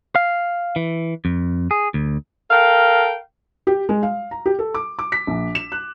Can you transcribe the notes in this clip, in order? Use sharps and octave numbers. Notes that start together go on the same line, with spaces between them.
F5
E3
F2
G#4
D2
A4 A#4 F5 G5
G4
G#3
F5
A#5
G4
A4
D6
D6
B6
A#1
E7
F#6